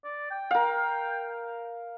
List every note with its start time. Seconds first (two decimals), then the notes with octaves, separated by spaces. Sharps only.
0.04 D5
0.31 G5
0.51 A#4 F5